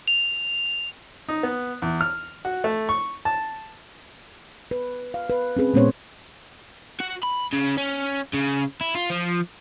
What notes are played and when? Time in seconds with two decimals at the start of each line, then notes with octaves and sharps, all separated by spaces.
0.08 F7
1.29 D#4
1.43 B3
1.82 E2
2.01 F6
2.45 F#4
2.64 A3
2.89 C#6
3.25 A5
4.71 B4
5.14 F5
5.30 B4
5.56 C4 C#4 G#4 B4
5.74 A#2 G#3 B3 C#4 C5 C#5
7.00 F#4
7.23 B5
7.53 C#3
7.77 C#4
8.34 C#3
8.81 E4
8.95 F4
9.10 F3